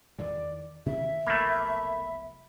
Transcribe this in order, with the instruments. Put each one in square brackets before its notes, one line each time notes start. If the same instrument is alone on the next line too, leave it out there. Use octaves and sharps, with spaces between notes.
[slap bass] E2 D#3 E3 [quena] D5
[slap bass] C3 D#3 E3 [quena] E5
[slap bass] F1 B1 [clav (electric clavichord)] A3 A#3 [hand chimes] B5